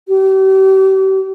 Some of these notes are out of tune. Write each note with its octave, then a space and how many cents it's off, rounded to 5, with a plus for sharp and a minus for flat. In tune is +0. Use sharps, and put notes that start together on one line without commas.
G4 -40